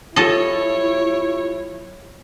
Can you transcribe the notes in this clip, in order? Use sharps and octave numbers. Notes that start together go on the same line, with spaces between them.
F#3 E4 F4 G4 A4 C#5 D#5